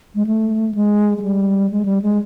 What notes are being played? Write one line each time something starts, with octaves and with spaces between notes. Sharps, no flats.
G#3
A3
G#3
G#3
G3
G#3
G3
G#3